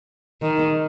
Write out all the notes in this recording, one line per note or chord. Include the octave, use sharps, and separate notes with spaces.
D#3